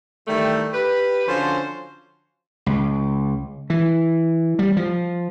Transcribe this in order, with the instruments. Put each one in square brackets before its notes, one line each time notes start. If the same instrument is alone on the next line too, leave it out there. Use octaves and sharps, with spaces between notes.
[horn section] D#3 E3 G3 A3
G4 B4
D3 F3 C#4 F#4 C5
[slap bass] C#2
E3
G3
F3